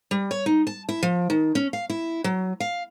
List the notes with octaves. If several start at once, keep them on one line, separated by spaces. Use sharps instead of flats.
G3
C#5
D#4
A5
E4
F3
D#3
C#4
F5
E4
F#3
F5